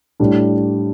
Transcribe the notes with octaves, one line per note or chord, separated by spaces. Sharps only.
A2 G3 D4